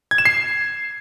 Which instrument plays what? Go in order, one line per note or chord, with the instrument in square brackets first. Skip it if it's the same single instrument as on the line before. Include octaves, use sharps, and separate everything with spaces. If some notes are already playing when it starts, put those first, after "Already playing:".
[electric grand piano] G#6
E7
C7